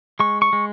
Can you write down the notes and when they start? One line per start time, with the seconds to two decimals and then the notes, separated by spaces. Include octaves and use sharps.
0.20 G#3 C#6
0.42 C#6
0.53 G#3